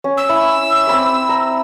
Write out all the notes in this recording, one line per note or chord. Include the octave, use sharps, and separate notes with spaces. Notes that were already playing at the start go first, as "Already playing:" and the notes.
C#4
E6
E4
C4 B5 D6
A#5